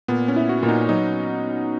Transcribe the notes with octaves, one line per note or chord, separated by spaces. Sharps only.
A#2 B3
C#4
E4
F#4
A#2
D#4
F#3 D#4